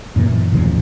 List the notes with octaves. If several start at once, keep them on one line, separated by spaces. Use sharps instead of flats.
F#2 A#2 E3
D#1 A1 C#3 F3